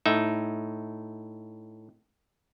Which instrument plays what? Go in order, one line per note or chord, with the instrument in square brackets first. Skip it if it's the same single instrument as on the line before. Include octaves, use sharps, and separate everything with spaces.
[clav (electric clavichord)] A2 D#4 E5